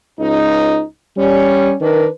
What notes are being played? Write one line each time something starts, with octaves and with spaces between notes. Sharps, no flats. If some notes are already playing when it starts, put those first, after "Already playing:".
C#2 D#4
G3 C#4
D#3 D4 A#4 B4